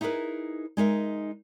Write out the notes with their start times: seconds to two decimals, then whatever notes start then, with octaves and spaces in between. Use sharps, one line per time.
0.01 D#4 E4 G#4 A#4 B4
0.77 G#3 D#4 A#4 E5